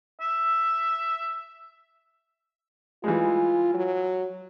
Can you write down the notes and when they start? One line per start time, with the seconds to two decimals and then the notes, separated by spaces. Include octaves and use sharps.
0.21 E5
3.04 E3 G3 G#3 F4
3.74 F#3